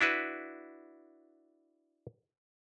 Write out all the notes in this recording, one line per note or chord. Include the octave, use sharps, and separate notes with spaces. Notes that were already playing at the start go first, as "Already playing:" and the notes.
D4 E4 F#4 B4